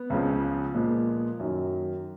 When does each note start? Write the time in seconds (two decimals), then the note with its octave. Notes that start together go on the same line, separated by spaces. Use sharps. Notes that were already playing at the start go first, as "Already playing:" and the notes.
Already playing: B3
0.10 C#2 C#3 F3
0.75 A#2 F3 G#3
1.40 F#2 D#3 F#3